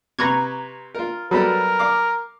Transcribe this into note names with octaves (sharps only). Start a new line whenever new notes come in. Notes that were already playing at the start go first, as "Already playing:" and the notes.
C3 B4 A#5 C#6 G#6
F4 A#4
F#3 G3 B3 A4 A#4
F5 D6